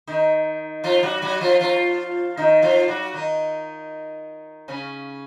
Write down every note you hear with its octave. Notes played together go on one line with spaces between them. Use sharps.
D#3 D#4
F3 F4
F#3 F#4
F#3 F#4
F3 F4
F3 F4
D#3 D#4
F3 F4
F#3 F#4
D#3 D#4
C#3 C#4